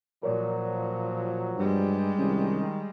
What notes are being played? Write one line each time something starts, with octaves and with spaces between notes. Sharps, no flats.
A#2 F3 F#3 A#4 C#5 D5
G2 G3 G#3
C2 D#3 C#4